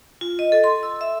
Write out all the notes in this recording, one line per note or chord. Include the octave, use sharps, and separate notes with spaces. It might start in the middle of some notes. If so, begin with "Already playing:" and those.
F4
D#5
A4
C6
E6
E5